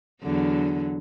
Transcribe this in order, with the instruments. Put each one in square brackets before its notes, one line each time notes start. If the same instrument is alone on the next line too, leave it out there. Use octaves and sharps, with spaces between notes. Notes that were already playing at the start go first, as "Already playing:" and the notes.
[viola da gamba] E2 D3 F#3